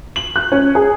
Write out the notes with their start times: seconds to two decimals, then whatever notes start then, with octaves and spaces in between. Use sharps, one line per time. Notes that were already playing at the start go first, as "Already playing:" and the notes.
0.16 F#7
0.36 F#6
0.52 C#4
0.75 G#4